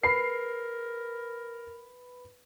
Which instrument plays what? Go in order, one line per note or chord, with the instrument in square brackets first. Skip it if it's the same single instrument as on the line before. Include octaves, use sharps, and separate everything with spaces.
[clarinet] A#4 [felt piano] B4 B5 [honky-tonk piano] C7